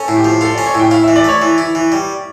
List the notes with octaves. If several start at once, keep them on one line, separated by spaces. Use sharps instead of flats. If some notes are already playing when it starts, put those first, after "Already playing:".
Already playing: C#4 A4
A2
G4
F3
F4 A4
C#4 D5
C#5
A2 G5
E4 F5
E3 E5
D5
A3 C#5
E3
E4
E3
G3